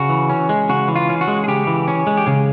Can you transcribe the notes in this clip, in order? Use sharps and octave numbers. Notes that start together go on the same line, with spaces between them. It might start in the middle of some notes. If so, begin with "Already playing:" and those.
Already playing: C#3 F#4
E3
C#4
G#3
C#3 F#4
E3
F4
C#4
F#4
G#3
G#4
C#3 G4
E3
C#4
G#3
G4
C#3 G#4